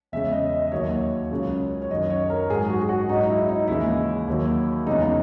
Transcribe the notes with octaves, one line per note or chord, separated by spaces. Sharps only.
E2 C#3 G#3 E5
D#5
D#5
D#5
D#2 D#3 F#3 C#5
C#2 C#3 F#3
C#5
F#2 D#3 F#3 D#5
C#5
A#4
G#2 F#3 G#4
F#4
G#4
F#4
G#2 F#3 D#4
E4
D#4
D#2 C#3 E3 G#3 E4
D#2 D#3 F#3
E2 C#3 G#3 D#4